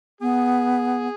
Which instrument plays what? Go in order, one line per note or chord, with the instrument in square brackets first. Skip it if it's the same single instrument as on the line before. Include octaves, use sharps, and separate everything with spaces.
[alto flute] B3 [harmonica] G#4